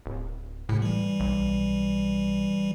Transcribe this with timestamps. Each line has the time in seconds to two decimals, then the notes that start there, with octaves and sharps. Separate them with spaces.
0.06 D1
0.69 G1 A2 C3
0.82 E3 G3
1.20 B1